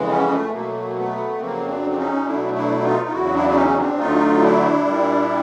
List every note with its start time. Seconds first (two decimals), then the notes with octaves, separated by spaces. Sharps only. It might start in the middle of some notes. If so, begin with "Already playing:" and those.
Already playing: F2 C#3 E3 G#3
0.09 B3 C#4
0.31 A3
0.52 B2 F#3 A3 A#3
0.95 A3 B3
1.39 F2 C#3 F#3 A#3 C4
1.68 C4 D4
1.91 D4
1.97 C#4 D#4
2.25 B2 F#3 A3 D4 E4
2.54 D4 E4
2.83 D#4 F4
3.08 F4
3.12 E2 C#3 F#3 E4 F#4
3.34 D4 E4
3.50 E4
3.55 C#4 D#4
3.67 D#4
3.77 C4 D4
3.98 D2 D3 F#3 A3 D#4 F4
4.42 D4 E4
4.86 A#2 G3